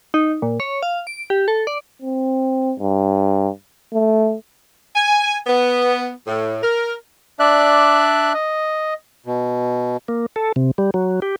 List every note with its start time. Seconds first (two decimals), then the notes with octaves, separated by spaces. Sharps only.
0.14 D#4
0.42 A#2
0.60 C#5
0.83 F5
1.07 D7
1.30 G4
1.48 A4
1.67 D5
2.02 C4
2.80 G2
3.94 A3
4.95 G#5
5.47 B3
6.27 A2
6.63 A#4
7.40 D4 D5 E5 F#6
8.34 D#5
9.26 B2
10.08 A#3
10.36 A4
10.56 C3
10.78 G3
10.94 F#3
11.22 G4